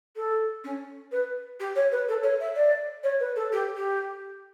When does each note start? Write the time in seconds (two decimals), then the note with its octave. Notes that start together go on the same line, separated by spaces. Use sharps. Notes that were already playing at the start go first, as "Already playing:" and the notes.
0.16 A4
0.64 C#4
1.12 B4
1.60 G4
1.76 C#5
1.92 B4
2.09 A4
2.23 C#5
2.40 E5
2.55 D5
3.04 C#5
3.20 B4
3.36 A4
3.52 G4
3.76 G4